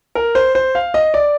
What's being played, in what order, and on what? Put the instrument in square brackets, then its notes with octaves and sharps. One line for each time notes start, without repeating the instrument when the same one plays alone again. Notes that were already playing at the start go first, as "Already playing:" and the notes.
[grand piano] A#4
C5
C5
F5
D#5
D5